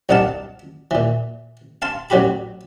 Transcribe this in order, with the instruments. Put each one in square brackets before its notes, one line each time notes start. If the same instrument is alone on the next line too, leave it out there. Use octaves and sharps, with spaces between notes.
[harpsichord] C2 G2 D#4 F5 F#5 A5
A#2 E3
F5 A5 C6
A1 F#3 F#4 G4 B5